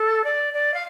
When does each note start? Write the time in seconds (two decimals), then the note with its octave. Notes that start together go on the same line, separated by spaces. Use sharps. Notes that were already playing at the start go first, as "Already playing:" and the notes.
Already playing: A4
0.24 D5
0.53 D5
0.74 F5